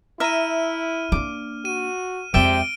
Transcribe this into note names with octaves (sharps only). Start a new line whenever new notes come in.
E4 E5 A#5 F6 D#7
A#3 D4 D6
F#4 D#7
F2 C3 G#3 D5 E5 G5 D7 G7